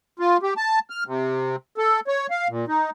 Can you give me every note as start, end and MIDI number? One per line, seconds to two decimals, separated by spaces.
0.19 0.37 65
0.43 0.54 67
0.57 0.79 81
0.90 1.04 89
1.07 1.56 48
1.78 2.00 69
2.07 2.27 73
2.30 2.48 77
2.49 2.65 46
2.68 2.90 63